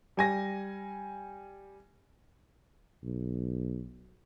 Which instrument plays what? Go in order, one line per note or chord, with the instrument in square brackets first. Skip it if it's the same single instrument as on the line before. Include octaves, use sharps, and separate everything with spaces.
[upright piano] G3 G#5 A#6
[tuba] B1